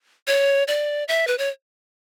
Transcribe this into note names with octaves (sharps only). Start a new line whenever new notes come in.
C#5
D5
E5
B4
C#5